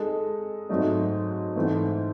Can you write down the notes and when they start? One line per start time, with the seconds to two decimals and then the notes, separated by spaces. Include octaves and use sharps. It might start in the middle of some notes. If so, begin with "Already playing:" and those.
Already playing: G#3 D#4 A4
0.69 G#2 F#3 A3 D#4
1.56 G#2 E3 A3